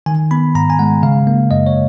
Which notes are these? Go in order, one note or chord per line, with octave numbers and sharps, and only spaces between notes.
D#3 G#5
B3 B5
G#2 A#5
G#5
G#3 F#5
C#3 F5
A#3
F#2 D#5
C#5